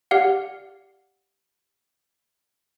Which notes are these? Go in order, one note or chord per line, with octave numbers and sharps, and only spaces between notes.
G4 D5 F5 F#5